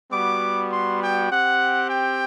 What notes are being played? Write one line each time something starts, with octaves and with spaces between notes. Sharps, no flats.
G3 B3 F#4 D6
C6
G5
C4 G4 F#5
G5